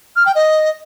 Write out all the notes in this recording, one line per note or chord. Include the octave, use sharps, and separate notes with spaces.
F6
G5
D#5